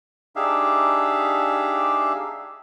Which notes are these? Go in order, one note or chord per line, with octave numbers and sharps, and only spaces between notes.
D4 D#4 G4 G#4 E5 F5